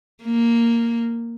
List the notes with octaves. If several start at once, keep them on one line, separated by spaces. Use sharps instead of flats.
A#3